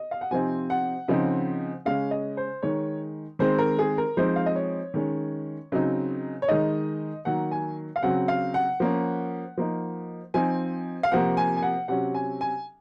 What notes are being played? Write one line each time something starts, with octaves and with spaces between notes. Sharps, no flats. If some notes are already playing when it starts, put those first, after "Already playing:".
Already playing: D#5
F5
F#5
C3 F3 C4 D#4 G#5
F#5
C#3 F3 C4 D#4
C#3 G#3 C#4 F5
D#5
C5
D#3 G#3 D#4 C#5
D#3 G#3 C4 C5
A#4
G#4
A#4
F3 G#3 C4 D#4 C5
F5
D#5
C#5
D#3 G#3 C#4
C#3 F#3 C4 D#4
C#5
D#3 G#3 D#4 D#5
D#3 F#3 A#3 F#5
G#5
F5
C#3 F#3 C4 F#5
F5
F#5
F3 A#3 C#4
F3 A#3 D#4
F3 C4 D#4 G#5
F5
C3 F3 A#3 F#5
G#5
G#5
F#5
C3 F#3 C#4 F#5
G#5
G#5